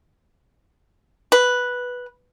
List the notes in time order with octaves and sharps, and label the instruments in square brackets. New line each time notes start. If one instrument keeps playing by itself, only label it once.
[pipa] B4